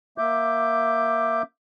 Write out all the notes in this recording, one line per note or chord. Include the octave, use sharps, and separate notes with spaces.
A#3 E5 D6 G6